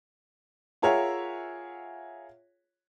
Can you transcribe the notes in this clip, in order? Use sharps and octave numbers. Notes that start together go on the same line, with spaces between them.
F4 G#4 A#4 C#5 E5 F#5